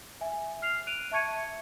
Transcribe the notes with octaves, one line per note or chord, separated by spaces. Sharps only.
E5 G#5
F6 C7 F7
F#6 D7 D#7 F7
E5 A5 C#6 G#6 C#7 D#7
E5